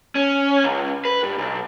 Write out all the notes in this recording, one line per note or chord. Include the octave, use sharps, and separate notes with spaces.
C#4
C#2
B4
G2
B1